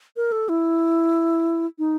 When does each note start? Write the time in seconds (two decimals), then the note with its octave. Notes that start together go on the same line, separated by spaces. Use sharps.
0.16 A#4
0.32 A4
0.49 E4
1.79 D#4